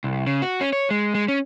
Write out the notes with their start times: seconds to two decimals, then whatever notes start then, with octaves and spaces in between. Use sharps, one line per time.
0.04 C2
0.27 C#3
0.42 F#4
0.61 C#4
0.73 C#5
0.90 G#3
1.15 G#3
1.28 C#4